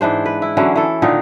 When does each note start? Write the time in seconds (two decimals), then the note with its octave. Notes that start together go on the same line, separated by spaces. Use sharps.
0.01 G#2 E3 D4 C5
0.26 B4
0.42 E4
0.57 D3 E3 F#3 C#4
0.76 E3 A4
1.02 A#2 D3 D#3 D#4